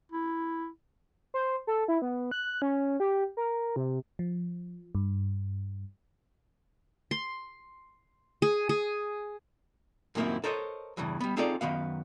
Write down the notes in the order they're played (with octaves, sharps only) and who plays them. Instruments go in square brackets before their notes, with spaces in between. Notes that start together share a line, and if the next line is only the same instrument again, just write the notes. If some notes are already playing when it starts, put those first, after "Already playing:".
[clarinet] E4
[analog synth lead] C5
A4
E4
B3
F#6
C#4
G4
A#4
C3
[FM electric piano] F3
G2
[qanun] C6
G#4
G#4
[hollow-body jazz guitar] F#2 A#2 D#3 A#3 C4 E4
A4 A#4 C5 C#5 D#5
E2 G2 C#3 E3
G3 B3
C4 D#4 F4 G#4 A4 D5
F#2 D#3 B3 F5